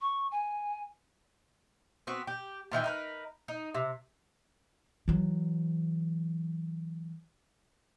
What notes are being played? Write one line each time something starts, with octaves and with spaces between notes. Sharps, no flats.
C#6
G#5
B3 C4 F#4
G4
A#2 D#3 E3 G5
D#4 A#4 B4
D#4
C3
E3 F#3